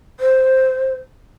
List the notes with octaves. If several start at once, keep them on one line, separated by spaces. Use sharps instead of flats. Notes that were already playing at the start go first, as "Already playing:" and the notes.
C5